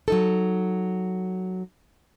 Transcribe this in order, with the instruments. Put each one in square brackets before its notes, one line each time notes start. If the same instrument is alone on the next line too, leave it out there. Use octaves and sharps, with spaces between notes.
[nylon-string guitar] F#3 D#4 A4